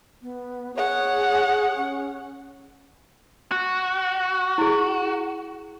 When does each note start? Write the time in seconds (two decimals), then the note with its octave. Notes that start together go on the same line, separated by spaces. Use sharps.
0.22 B3
0.76 G#4 C#5 F#5
1.76 C#4
3.52 F#4
4.58 E4 G#4